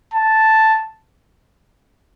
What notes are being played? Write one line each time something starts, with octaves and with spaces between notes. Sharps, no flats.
A5